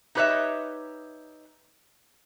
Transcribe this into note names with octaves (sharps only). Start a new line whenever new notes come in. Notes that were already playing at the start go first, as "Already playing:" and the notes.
D#4 G4 B4 C#5 D#5 E5